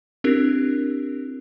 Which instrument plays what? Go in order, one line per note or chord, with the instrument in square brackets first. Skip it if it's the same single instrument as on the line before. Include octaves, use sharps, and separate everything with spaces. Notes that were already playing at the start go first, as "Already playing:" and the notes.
[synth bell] C4 D4 E4 G4 A#4